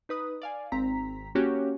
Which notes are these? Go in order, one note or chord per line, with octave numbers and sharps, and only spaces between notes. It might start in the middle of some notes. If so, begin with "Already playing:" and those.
D#4 B4 D#6
D5 F5 G#5
G#1 C4 A#5 B6
A#3 C#4 F#4 G4 C#5